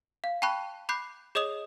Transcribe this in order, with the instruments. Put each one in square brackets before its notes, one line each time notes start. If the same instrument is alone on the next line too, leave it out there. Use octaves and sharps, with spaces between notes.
[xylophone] F5
G5 A5 B5 C#6 F#6
B5 D6 F#6 G6 C7
G#4 C#5 D#5 D#6 F7